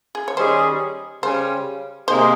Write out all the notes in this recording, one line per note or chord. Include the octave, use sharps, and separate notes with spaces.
G#4
C#5
D#3 G3 C#4 G#4 C5
C#3 G3 C#4 C5
C3 D#3 A#3 D#4 G#4 C5